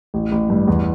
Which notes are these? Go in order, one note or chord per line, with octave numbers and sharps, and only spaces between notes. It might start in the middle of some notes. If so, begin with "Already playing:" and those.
A1
A1
G2
E2